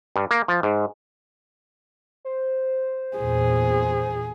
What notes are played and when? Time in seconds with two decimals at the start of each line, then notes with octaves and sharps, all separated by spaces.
0.16 G2
0.31 A#3
0.48 F3
0.63 G#2
2.25 C5
3.17 E2 A#2 G#4